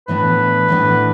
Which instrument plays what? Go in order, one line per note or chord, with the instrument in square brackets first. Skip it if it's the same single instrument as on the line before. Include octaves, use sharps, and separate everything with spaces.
[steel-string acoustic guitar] A2 E3 B3 D4 [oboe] B4
[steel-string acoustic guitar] A2 E3 B3 D4